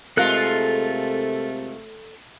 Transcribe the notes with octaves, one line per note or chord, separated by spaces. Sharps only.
C3 G#3 A3 F4 A4 A#4 F#6